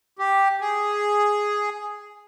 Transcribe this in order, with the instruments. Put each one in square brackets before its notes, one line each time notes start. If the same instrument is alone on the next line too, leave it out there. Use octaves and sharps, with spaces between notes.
[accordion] G4
G#4